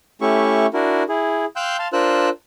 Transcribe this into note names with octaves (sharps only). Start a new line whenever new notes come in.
A3 C#4 E4 G4 E5 C#6
D4 E4 F#4 A#4
E4 G#4
F5 G5 C6 E6 F#6 G6
F5 A5 C6
D4 F4 A#4 C5 E6 F#6